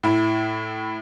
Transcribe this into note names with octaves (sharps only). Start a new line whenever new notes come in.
A2 E4